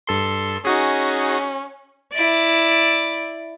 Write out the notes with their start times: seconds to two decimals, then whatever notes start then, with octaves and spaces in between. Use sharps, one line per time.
0.07 G2 A4 C6
0.65 C#4 D#4 F#4 G#4
2.13 E4 D5